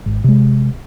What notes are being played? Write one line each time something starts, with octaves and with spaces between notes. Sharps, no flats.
G#1
C3 G#3